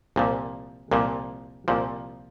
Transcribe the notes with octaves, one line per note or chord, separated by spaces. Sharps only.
C2 A#2 F3
C2 A#2 F3
C2 A#2 F3